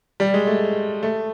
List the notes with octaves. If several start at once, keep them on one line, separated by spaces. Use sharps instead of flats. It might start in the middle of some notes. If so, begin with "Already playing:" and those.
G3
G#3
A3
A3